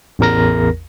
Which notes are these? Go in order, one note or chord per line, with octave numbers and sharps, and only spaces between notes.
A1 E2 A#4 A#6